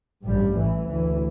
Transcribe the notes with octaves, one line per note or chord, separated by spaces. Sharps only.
A1 G2 G3
A1 A2 E3
D2 E3